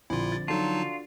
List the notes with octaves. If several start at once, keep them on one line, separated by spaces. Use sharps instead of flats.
A#1 D3 F3 C4 E4 F4
A6
F#3 D4 D#4 F4 F#4 A4 A5